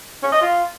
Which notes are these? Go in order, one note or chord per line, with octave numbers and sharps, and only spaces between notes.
C#4
D#5
F4